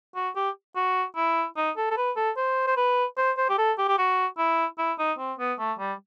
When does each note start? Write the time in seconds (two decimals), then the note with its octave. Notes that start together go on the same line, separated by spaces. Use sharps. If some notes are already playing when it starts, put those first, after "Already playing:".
0.15 F#4
0.36 G4
0.76 F#4
1.16 E4
1.57 D#4
1.77 A4
1.91 A4
1.97 B4
2.16 A4
2.37 C5
2.67 C5
2.77 B4
3.17 C5
3.37 C5
3.50 G4
3.58 A4
3.78 G4
3.88 G4
3.98 F#4
4.38 E4
4.79 E4
4.99 D#4
5.19 C4
5.39 B3
5.59 A3
5.79 G3